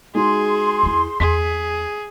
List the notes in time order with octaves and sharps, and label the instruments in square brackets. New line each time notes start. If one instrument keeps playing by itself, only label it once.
[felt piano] G#3 D#4 F#4 [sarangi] G#4 [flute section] C6
[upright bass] E2 E4
[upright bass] E2 [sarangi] G#4 [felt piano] B6